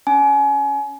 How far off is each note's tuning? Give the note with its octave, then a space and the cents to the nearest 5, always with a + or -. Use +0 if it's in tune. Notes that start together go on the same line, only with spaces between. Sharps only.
C#4 +0 G#5 +30